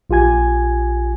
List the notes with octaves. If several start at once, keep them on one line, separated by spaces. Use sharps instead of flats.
A#1 F4 G4 G#5 G#6